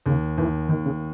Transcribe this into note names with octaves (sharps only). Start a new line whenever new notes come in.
D#2 C#3
D#2 E3
D#2 D#3
C#3